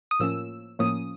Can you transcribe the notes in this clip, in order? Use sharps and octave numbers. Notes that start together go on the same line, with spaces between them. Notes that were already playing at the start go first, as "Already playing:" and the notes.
D#6
A2 F3 A#3 C#4 E6
A2 F3 A#3 C#4 D#6